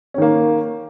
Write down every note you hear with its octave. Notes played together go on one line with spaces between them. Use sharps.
D#3 A#3 C#4